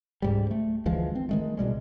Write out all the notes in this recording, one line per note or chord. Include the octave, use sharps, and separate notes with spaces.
C#2 G#2 G3
A3
D2 E3 F3 G#3
C4
D#3 G#3 A3
C2 B2 G3 G#3